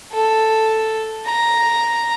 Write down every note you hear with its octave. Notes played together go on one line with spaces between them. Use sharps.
A4
A#5